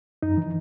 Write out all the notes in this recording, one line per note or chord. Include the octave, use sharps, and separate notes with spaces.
F#2 D#4
E3